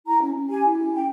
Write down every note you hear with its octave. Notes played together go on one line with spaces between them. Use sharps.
E4 A#5
C#4
C#4
G4 G#5
E4
C#4
C#4 G5